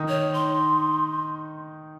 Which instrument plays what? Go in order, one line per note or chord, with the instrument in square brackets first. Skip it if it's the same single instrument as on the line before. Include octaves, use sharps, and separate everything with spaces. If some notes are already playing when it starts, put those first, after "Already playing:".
Already playing: [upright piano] D#3 D#4
[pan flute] C#5
C6